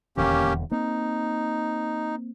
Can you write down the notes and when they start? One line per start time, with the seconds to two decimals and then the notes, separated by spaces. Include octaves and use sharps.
0.17 D#1 E2 D3 A#3 C#4 G4
0.71 A#3 C4 D#4